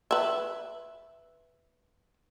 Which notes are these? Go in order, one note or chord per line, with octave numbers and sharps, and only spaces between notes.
B4 E5